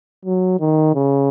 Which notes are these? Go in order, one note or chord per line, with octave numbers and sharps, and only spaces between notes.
F#3
D#3
C#3